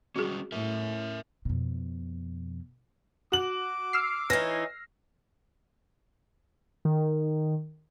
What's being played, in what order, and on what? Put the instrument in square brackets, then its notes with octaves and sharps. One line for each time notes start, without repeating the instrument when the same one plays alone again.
[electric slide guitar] G3 G#3 C#4 [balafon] F#4 G#4
[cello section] A2 [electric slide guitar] A#4 E5
[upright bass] F2 B2
[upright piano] F#4 F#7 [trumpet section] D6
[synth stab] E6 F6 C7
[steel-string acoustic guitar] E3 D#4 [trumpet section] C#5 G#5 [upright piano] A#6
[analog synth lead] D#3